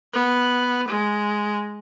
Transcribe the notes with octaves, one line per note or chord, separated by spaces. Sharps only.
B3
G#3